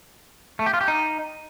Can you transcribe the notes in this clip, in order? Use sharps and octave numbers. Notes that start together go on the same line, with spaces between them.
A3
G4
F4
G4
D#4